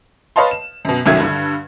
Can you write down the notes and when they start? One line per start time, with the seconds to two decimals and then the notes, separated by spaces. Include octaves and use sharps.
0.36 B4 C#5 D#5 F5 A5 C6
0.51 E7
0.85 F#2 B2
1.06 C2 F#2 D#3 F#3 A3 G#6
1.20 G2 D3